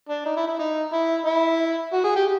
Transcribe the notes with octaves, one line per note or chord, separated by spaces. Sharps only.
D4
D#4
E4
E4
D#4
E4
E4
F#4
G#4
G4